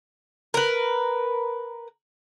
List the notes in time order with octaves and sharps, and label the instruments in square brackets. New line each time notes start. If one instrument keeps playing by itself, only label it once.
[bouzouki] A#4 B4